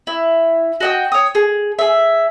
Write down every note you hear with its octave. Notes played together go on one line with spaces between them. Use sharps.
E4
F#4 D#5 G5
C#5 D#6
G#4
G#4 E5